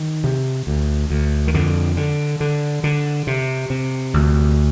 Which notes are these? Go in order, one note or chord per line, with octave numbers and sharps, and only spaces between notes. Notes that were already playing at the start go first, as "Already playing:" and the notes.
Already playing: D#3
C3
D2
D2
D#3
F2 D3
D3
D3
D3
C3
C3
D2